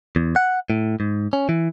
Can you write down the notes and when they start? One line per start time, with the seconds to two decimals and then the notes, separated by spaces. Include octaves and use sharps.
0.16 E2
0.36 F#5
0.70 A2
1.00 G#2
1.33 C#4
1.49 E3